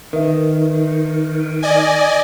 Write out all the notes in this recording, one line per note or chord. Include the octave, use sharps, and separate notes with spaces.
D#3 A#4 B4 E5
D5 D#5 G#5